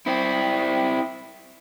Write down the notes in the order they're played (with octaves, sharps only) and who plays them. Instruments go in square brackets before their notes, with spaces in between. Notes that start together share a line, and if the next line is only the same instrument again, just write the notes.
[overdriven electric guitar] C4 E4